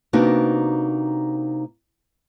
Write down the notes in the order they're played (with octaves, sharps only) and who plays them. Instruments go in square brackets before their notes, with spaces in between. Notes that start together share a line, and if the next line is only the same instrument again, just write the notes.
[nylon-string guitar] C3 A#3 B3 D4 D#4 F#4